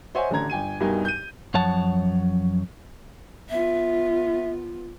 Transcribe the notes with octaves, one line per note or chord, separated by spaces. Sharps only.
C5 C#5 D#5 E5 F#5 G#5
A1 D3 C#4 A4 A#5 G#6
G1 G5 G#5 D#7
C2 G2 B2 D#4 A#4 G#5
G6 D#7
F#2 F3 C#5 F#5 A5
B3 F4 E5